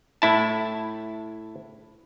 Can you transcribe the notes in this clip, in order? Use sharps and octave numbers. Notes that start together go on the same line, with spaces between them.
A2 E4 A5